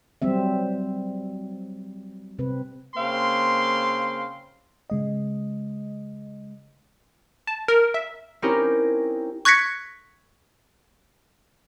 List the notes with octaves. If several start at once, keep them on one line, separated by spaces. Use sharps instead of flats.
F#3 G3 C4 E5
C3 C4 B4
C#3 A#3 C4 F5 C6
C#3 G#3 D#5
A5
A#4
E5
C4 C#4 D#4 E4 G4 A#4
C#6 F#6 G#6 A#6 B6 C#7